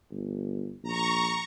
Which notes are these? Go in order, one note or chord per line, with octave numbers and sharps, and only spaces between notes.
G1
A#1 A#5 C#6